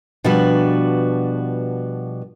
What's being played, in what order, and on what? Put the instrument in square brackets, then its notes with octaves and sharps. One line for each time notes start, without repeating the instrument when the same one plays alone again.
[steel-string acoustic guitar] B2 F3 G3 D4 F#4 B4